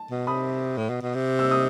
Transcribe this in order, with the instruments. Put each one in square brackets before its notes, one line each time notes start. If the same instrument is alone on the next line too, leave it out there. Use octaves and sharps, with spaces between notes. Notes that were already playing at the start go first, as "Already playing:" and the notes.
Already playing: [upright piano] A5
[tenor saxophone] B2
[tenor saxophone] C3 [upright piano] B5 D#6
[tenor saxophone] A2
B2
B2
C3
[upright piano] E6
D#6